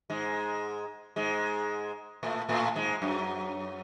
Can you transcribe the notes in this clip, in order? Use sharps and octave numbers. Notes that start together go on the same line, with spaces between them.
G#2 G#3
G#2 G#3
A2 A3
A2 A3
G#2 G#3
F#2 F#3